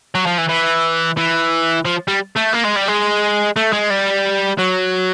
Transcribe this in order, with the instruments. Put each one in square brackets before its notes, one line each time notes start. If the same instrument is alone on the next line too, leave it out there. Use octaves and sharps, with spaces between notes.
[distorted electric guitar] F#3
F3
E3
E3
E3
F3
G3
A3
A#3
G#3
G3
G#3
A3
G#3
G3
F#3